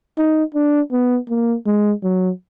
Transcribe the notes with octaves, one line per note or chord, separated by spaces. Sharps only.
D#4
D4
B3
A#3
G#3
F#3